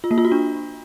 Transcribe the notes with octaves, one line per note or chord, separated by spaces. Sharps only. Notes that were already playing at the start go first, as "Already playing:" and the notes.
F4
A#3
F4
F#4
D4